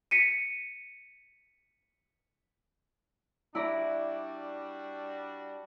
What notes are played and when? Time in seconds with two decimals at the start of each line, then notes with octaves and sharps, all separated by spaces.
0.11 B6 C#7 D#7
3.55 G3 D4 E4 F#4 D5 A#5